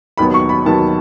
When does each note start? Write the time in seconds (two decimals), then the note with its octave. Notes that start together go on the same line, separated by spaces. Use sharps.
0.18 E1 D#2 D#3 F#3 B3 B5
0.34 C#6
0.49 B5
0.65 E1 D#2 D#3 F#3 B3 A5